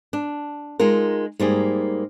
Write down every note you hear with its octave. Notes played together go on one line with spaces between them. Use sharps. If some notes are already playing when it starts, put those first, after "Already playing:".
D4
G#3 D#4 F4 A#4
G#2 G3 A#3 G#4